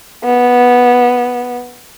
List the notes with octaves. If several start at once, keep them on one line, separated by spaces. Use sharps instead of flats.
B3